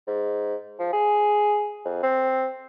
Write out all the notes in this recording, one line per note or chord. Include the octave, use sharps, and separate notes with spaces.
G#2
F3
G#4
F2
C4